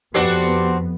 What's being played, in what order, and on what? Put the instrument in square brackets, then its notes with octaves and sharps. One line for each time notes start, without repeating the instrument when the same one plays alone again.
[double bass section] F2 B3 [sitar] C4 D4 F#4 [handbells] G4 B4 C7